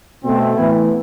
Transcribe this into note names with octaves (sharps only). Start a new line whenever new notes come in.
B2 A3 C4
A2 E3 B3 E4